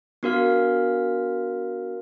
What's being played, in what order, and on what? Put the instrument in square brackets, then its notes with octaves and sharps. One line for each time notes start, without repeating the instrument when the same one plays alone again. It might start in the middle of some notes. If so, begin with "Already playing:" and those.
[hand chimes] B3 D4 F#4 A#4 F5 F6